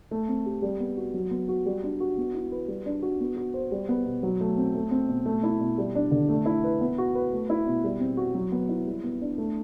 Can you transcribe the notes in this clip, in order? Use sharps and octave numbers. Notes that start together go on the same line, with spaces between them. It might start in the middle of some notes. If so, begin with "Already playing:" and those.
A3
C4
G4
G3
B3
F#4
F#3
B3
F#4
G3
D4
F#4
B3
E4
B4
G3
D4
F#4
B3
F#4
C5
G3
B3
B2
F#3
A3
C4
A3
C4
B2
A3
E4
B2
G3
D4
D3
A3
E4
B4
B3
F#4
B4
A3
E4
B2
G3
C4
F#4
F#3
B3
E4
G3
B3
D4
A3